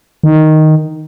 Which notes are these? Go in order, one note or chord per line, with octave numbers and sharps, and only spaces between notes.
D#3